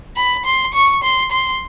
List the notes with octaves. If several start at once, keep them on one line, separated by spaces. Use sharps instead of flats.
B5
C6
C#6
C6
C6